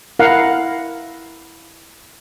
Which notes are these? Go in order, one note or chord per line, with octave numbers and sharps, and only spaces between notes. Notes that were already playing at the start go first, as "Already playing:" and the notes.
E4 A#4 F5 F#5